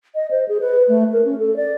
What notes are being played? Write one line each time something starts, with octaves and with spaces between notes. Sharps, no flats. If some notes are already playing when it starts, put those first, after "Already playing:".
D#5
C5
G#4
B4
A3
A#4
C#4
A4
D5